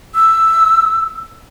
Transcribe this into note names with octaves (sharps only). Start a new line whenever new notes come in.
E6